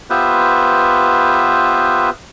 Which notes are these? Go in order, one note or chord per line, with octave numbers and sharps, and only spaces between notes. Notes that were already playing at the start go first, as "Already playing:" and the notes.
B3 F4 G4 B4 C5 E5